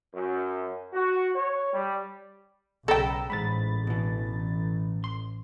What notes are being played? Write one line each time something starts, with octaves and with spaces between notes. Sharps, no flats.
F#2
F#4
C#5
G3
B1 C#3 A4 G5 A#5 B5 E6
A1 G#2 G#3 B5 A6
B2 E3
C6